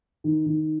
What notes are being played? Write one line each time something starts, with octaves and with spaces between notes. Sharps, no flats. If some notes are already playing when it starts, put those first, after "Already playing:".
D#3
D#3